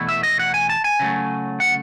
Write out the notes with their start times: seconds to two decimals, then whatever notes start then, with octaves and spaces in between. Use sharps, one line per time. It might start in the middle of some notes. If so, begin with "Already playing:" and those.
Already playing: E2 B2 A3 E4
0.09 E5
0.23 D#5
0.39 F#5
0.54 G#5
0.69 A5
0.84 G#5
0.99 C#3 F#3 A3
1.60 F#5